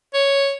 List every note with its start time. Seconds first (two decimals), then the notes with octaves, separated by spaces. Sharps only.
0.14 C#5